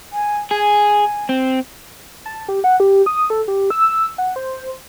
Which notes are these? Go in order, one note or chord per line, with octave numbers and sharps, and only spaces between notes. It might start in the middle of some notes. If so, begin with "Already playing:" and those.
G#5
G#4 G#5
C4
A5
G4
F#5
G4
D#6
A4
G4
E6
F#5
C5